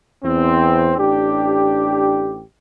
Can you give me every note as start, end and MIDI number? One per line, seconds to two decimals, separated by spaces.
0.24 0.94 40
0.24 0.94 60
0.97 2.40 33
0.97 2.40 62
0.97 2.40 67